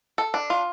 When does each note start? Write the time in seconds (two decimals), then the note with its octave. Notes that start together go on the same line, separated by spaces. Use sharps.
0.18 A4
0.34 D4
0.50 F4